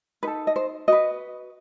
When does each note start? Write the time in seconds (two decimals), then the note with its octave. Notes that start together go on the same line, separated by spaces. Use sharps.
0.23 D#4 A4 B4
0.47 D#5
0.56 C5
0.88 F#4 B4 D#5